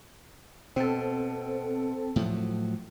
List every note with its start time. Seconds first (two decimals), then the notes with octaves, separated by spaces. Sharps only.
0.76 B2 C4 A4
2.16 A2 F3 F#3